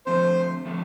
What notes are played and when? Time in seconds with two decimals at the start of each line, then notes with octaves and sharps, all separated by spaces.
0.06 D3 F3 A3 C4 C5
0.65 D3 F3 A3 C4